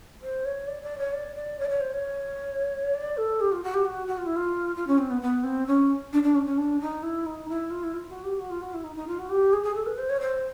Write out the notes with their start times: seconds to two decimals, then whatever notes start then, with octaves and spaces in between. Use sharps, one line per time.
0.21 C5
0.45 C#5
0.67 D5
0.83 D5
0.98 C#5
1.13 D5
1.35 D5
1.59 C#5
1.65 D5
1.69 C#5
1.80 C5
1.92 C#5
2.94 D5
3.17 A4
3.40 G4
3.52 F4
3.63 F#4
3.74 G4
3.85 F#4
4.07 F#4
4.18 F4
4.26 E4
4.35 F4
4.75 F4
4.87 C#4
4.98 C4
5.10 B3
5.21 B3
5.43 C4
5.67 C#4
6.12 D4
6.23 D4
6.35 C#4
6.45 C#4
6.57 D4
6.80 D#4
7.02 E4
7.25 D#4
7.48 E4
7.70 F4
7.83 E4
7.93 F4
8.09 F#4
8.24 G4
8.39 F#4
8.50 F4
8.61 F#4
8.73 E4
8.83 D#4
8.95 D#4
9.07 F4
9.18 F#4
9.29 G4
9.53 G#4
9.63 G#4
9.74 A4
9.86 B4
9.98 C5
10.09 C#5
10.20 C5